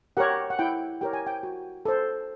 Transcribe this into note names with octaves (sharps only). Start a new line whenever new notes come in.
G4 A#4 C#5 F#5
F#5
E4 G5
G4 A#4 C#5 G5
G#5
G5
F#4
A4 C5